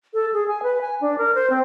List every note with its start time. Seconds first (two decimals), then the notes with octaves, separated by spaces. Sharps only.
0.14 A4
0.34 G#4
0.48 G#5
0.63 B4
0.81 G#5
1.01 D4
1.18 A#4
1.35 C5
1.50 C4